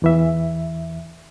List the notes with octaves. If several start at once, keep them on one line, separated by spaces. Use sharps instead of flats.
E2 E3 E5